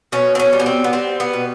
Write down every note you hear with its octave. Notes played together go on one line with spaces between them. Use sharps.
B2 C#4
C4
C#4
G3
B3
C4
B3
G3 C4
B3
B2